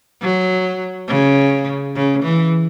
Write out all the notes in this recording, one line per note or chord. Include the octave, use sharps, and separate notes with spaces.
F#3
C#3
C#3
E3